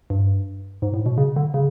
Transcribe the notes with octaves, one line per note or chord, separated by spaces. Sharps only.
G2
G#2
A2
B2
C#3
D3
C#3